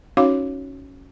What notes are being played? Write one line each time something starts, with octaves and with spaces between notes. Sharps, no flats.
C#4 D#4 F#4 C#5 F5 D6